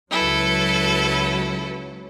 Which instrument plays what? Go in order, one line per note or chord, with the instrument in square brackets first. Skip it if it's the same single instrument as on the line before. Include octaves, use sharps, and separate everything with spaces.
[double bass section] C#2 F#3 [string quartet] E4 A4 B4